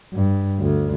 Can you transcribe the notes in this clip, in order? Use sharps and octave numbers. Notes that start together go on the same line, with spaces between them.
G2
D2